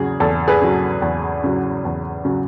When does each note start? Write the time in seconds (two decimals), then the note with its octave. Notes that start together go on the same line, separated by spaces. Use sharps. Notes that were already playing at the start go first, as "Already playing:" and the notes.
Already playing: E2 C#3 F#3 G#4
0.20 E2 A4
0.48 G#4 B4
0.62 C#3 F#3
1.02 E2
1.44 C#3 F#3
1.85 E2
2.25 C#3 F#3